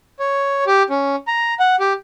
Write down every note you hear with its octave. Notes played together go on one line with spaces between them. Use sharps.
C#5
G4
C#4
A#5
F#5
G4